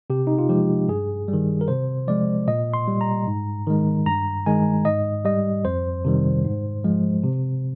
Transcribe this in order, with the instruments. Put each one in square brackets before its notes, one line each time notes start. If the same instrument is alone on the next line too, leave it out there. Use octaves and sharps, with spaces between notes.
[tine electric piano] C3 G4
D#4
F4
F3 G#3 G4
G2 G#4
G3
D#3
A#4
C3 C5
F3 G#3 D5
A#2 D#5
C6
G3
A#5
G#2
D#3 G#3
G2 A#5
D#3 G#3 G#5
G#2 D#5
G3 D#5
F2 C5
C3 D#3 G3
G#2
F3 G#3
C3